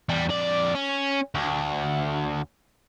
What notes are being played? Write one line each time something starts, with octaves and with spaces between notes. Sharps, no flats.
E2 G3
F2 D5
C#4
D2